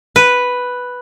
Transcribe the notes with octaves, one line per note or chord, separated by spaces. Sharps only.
B4